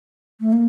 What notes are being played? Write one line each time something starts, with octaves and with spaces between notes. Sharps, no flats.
A3
A#3